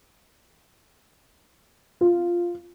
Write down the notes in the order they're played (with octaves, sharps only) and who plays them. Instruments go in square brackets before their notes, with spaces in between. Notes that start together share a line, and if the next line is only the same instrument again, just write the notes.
[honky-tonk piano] F4